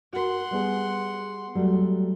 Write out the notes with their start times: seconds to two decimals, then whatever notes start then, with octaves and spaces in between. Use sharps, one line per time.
0.13 F#4 A#4 F#5 C6
0.51 G3 B3 G#4
1.55 F#3 G3 A3